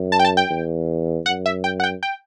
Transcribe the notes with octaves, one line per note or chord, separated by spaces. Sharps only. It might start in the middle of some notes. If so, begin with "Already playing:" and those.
Already playing: F#2
A5
G5
A5
G5
E2
F#2 F#5
E5
G5
F#5
G5
G5